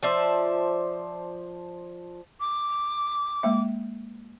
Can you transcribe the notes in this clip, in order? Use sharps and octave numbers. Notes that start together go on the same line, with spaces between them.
F3 C5 D5 E5
D6
G#3 A#3 E5